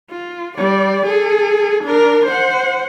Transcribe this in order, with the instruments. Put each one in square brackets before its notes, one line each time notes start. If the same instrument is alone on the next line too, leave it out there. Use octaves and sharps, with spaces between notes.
[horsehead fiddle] F4
G3 D5
G#4 A4
D4 A#4
C5 F#5